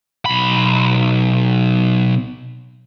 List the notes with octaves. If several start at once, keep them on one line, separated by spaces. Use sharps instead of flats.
B1 B5